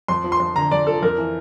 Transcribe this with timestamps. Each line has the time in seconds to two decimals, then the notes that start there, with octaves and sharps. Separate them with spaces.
0.08 F2 C6
0.24 F3
0.32 C6
0.40 F2
0.56 D3 A#5
0.71 F2 D5
0.87 F3 A4
1.02 F2 A#4
1.18 E3